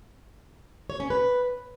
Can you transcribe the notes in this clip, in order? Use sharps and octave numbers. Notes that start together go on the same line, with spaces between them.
C#5
C#4
B4